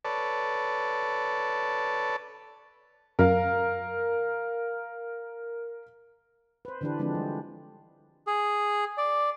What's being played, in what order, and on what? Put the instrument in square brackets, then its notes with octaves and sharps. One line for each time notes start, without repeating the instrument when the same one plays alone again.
[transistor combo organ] A4 B4 C#5 D5 A5
[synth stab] F#2 [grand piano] A#4 F5
[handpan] B4 C5
D3 E3 D4 G4 B4
D3 F3 G#3 C4 D4
G3
[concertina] G#4
D5